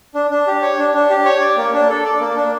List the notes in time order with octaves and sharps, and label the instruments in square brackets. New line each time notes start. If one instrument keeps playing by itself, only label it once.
[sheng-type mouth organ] D4
D4
G4
C#5
D4
D4
G4
C#5
D5
A#3
D4
A4
D5
A#3
D4